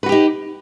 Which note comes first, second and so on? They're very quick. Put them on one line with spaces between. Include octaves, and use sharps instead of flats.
B4 F#4 G4 D#4